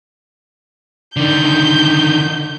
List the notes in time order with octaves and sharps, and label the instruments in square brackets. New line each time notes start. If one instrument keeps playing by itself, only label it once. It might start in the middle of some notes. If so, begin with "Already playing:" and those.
[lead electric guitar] D3 D#3 [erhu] G6